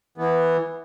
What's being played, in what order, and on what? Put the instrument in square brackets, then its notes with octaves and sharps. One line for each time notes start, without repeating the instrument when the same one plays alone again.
[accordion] E3 B3